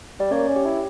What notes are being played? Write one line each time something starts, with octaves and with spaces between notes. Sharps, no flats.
G3 D5
A#3 C#4 C#5
C#4
G4
E4